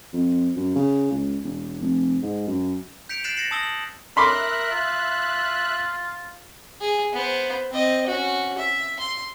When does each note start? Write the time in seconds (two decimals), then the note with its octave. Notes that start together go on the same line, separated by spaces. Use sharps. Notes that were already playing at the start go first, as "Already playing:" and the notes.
0.13 F2
0.56 F#2
0.75 C#3
1.11 C#2
1.44 E1
1.82 F1
2.23 G#2
2.47 F#2
3.09 G6 B6 C#7 D7 F7
3.24 F#6 A6 C7 D7 E7 F#7
3.36 A6 A#6 C7 C#7 E7 F#7
3.51 A5 D#6 E6 A#6 G7
3.63 F#7
4.17 A#4 E5 B5 C6 D6 F#6
4.71 F4
6.81 G#4
7.13 B3 C5
7.71 C4 D#5
8.06 C#4 F#4
8.58 E5
8.99 C6